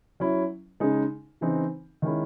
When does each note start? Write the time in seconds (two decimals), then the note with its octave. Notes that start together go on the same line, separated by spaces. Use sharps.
0.20 F#3 C#4 E4
0.80 C#3 G#3 D#4
1.41 C#3 E3 C4 D#4
2.02 D#3 G#3 C#4 E4